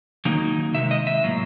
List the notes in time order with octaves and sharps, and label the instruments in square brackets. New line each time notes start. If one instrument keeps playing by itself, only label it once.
[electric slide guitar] D#3 F#3 A#3 D#4
C3 D#3 G#3 E5
D#5
E5
A2 F#3 A#3